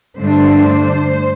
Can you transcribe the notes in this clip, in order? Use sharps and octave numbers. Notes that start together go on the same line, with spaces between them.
G2 D3 A3 D4 C5